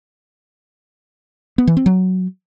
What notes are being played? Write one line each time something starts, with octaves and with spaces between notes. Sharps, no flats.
B3
E3
C4
F#3